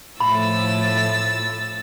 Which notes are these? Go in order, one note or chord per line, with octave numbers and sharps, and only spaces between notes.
A2 F3 A3 E4 B5 E6 A6